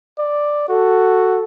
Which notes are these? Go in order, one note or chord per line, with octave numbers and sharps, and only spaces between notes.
D5
F#4 A4